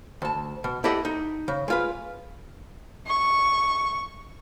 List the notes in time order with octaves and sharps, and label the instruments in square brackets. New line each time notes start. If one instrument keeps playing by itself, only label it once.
[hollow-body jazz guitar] D2 A5
B2
E4 G4 A4 D5 D#5 F#5
D#4
C#3
G#3 F4 B4
[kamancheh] C#6